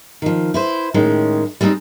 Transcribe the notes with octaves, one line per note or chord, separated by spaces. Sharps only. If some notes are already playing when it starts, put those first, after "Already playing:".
D#3 F3
E4 B4 C5
A2 D#3 G#3 C#4
G3 G#3 C4 D4 D#4